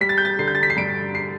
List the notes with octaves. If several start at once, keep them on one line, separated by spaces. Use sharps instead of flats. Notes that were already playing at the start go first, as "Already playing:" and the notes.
G3 B6
A6
G6
A6
D3 C7
G6
A6
B6
C7
G2 D7
C7